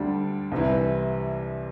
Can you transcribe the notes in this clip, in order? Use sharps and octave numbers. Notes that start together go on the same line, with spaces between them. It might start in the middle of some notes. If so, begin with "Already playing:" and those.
Already playing: D2 D3 G3 D4
C2 C3 E3